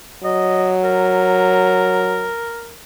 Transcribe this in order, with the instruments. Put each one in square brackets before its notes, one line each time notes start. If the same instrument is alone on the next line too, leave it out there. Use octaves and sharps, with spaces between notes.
[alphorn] F#3 [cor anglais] D#5
[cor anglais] A#4